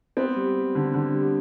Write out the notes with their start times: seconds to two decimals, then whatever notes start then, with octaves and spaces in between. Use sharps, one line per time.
0.17 B3 C4
0.36 G3
0.55 G3
0.75 D3
0.94 D3
1.14 G3